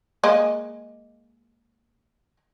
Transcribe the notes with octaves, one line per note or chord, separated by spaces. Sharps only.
G#3 A#3 D#5